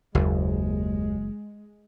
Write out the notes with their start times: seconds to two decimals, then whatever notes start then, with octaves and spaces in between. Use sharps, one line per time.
0.15 F#1 D#2 G#3